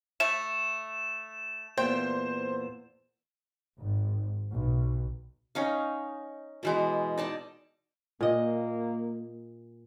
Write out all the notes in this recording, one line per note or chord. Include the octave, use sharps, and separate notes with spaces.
A3 E5 E7
E2 A#2 C5 G5
G#1
B1
C#4 D#4 F5
B2 E3 G#3
D#4 D5 A5
A#2 A#3 D#5